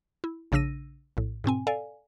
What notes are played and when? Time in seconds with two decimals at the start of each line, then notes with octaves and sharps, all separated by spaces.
0.24 E4
0.52 A#1 C#3 D4 E6 A#6 D#7
1.17 A#1 A2
1.44 G#2 B2 C4 G#5
1.67 A4 D5 F5 G#5